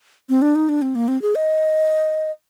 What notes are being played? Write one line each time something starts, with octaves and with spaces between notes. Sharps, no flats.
C4
D4
D#4
D4
C4
A#3
C4
G#4
D#5